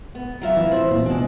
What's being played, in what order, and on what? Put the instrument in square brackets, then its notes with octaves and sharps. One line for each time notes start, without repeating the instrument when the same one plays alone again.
[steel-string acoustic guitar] B3
F#3 F4 E5
[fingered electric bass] E3
[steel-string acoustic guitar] C4
[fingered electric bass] A#2
[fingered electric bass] B2 [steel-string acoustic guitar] G#3 D4